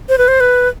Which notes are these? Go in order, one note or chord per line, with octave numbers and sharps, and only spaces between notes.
C5
B4
C5
B4